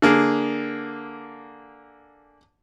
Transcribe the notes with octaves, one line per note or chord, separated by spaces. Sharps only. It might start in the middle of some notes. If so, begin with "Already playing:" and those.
D3 A#3 G#4